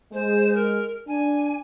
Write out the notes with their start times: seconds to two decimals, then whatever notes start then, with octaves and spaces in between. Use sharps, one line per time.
0.13 G#3 C5
0.54 A#4
1.08 D4 G#5